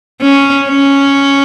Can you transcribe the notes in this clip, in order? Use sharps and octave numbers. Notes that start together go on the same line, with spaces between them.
C#4
C#4